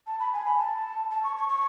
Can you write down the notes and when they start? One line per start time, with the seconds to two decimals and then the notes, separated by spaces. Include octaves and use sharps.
0.07 A5
0.20 B5
0.33 G#5
0.45 B5
0.59 A5
1.11 A5
1.24 C#6
1.37 C#6
1.49 C#6